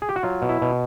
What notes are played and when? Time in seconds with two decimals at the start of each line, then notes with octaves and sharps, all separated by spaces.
0.02 G#4
0.09 G4
0.16 F#4
0.23 F#3 F4
0.42 B2
0.49 E4
0.62 B2